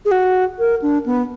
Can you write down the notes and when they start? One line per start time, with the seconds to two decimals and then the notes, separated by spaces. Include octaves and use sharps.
0.05 G#4
0.11 F#4
0.59 A#4
0.82 D4
1.06 B3